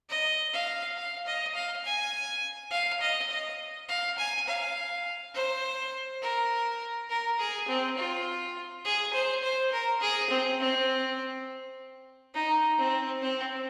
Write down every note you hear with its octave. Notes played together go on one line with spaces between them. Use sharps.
D#5
F5
F5
D#5
F5
G#5
F5
D#5
D#5
F5
G#5
F5
C5
A#4
A#4
G#4
C4
F4
G#4
C5
C5
A#4
G#4
C4
C4
D#4
C4
C4